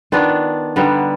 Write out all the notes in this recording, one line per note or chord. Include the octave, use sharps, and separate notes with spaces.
D#3 B3 D4 F4
D3 G3 B3 D#4